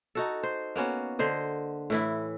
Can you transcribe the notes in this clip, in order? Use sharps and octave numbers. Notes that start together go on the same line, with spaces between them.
D#4 F#4 A4
C5
A#3 B3 C#4 F#4
D3 C5 D#5
A2 E3 E4